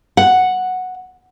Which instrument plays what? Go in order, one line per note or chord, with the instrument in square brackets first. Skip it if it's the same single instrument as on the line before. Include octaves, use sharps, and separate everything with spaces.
[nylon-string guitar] F#5